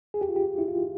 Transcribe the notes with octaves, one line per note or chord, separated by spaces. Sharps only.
G#4
G4
F4
G4
E4
F4